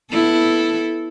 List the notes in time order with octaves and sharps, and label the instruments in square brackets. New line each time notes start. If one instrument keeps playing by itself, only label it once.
[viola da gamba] B3 E4 A4